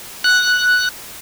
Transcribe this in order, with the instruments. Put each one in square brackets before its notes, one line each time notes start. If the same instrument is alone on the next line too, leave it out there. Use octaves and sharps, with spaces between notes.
[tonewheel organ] F#6